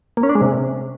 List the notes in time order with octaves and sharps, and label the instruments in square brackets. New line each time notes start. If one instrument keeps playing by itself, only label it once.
[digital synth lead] A#3
C#4
D4
G#3
C3